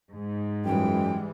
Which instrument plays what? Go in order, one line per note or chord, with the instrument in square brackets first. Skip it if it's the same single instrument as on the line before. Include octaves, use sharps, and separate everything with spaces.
[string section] G#2
[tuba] F#2 [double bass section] E3 G3 G#3 [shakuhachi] G5